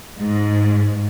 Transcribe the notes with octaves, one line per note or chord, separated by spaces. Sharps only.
G#2